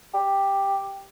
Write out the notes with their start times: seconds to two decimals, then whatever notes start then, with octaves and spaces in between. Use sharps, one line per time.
0.14 G4